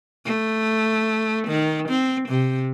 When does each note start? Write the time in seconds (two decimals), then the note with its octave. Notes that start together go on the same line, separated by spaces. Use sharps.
0.25 A3
1.48 D#3
1.89 C4
2.29 C3